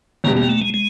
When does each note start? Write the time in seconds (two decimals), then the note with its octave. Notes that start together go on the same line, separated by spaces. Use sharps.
0.24 E2 B2 G3 A#3
0.37 A#3
0.49 A3
0.61 G#3
0.74 G#3